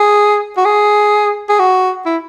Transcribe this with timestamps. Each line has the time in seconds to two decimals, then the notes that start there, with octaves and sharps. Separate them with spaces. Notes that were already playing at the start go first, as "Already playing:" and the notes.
Already playing: G#4
0.57 F#4
0.65 G#4
1.49 G#4
1.59 F#4
2.06 E4